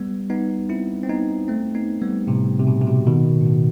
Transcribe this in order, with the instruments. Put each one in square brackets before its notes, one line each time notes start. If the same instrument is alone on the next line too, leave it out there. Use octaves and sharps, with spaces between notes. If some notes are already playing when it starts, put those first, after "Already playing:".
Already playing: [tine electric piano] G3 B3
B3 D#4
C4 E4
C4
B3 D#4
A3 C4
B3 D#4
G3 B3
A2 C3
C3
B2
C3
B2
B2 D#3
A2
B2